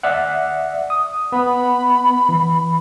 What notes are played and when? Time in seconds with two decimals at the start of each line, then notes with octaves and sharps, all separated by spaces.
0.03 D5 E5 F#5
0.90 D#6
1.32 B3 B5
2.29 E3